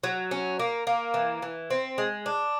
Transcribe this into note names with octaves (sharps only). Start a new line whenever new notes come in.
F#3
C#4
A#3
A#3
E3
E3
C4
G#3
D4